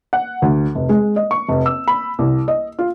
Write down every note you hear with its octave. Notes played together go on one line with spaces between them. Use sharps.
F#5
D2
F1
G#3
D#5
C#6
F1
E6
B5
C2
D#5
F4